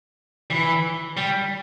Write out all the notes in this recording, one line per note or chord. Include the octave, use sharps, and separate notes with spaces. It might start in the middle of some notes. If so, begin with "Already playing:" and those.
E3
G3